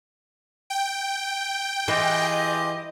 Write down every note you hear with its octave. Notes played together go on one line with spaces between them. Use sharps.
G5
E3 F4 G4 G#4 D#5